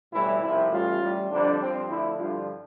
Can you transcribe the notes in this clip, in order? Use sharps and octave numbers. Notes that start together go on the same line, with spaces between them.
B1 A2 E3 G3 E4
C2 C3 F3 E4
A1 A2 E3 G3 F4
A1 A2 G3
F2 D3 G3 D4
G2 F3 C4
D2 D3 F3 E4
G2 D3 F3 F4